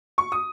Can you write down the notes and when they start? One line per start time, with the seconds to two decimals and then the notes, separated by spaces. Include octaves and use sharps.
0.18 C#6
0.32 D#6